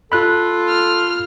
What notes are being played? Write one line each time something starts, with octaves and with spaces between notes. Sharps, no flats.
F4 A4 B5 F#6
F6